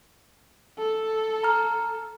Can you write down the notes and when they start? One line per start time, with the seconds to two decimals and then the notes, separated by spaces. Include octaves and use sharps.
0.79 A4
1.44 A#5 F6